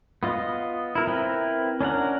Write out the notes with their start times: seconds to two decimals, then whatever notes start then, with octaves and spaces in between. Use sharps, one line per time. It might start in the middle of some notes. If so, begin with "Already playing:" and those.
0.23 B3 F4 D#5
0.95 E4 A#4
1.07 C4 E4 A#4 B4
1.81 C#4 D4 A#4 F#5